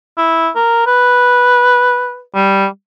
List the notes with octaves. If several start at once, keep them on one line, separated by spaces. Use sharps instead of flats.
E4
A#4
B4
G3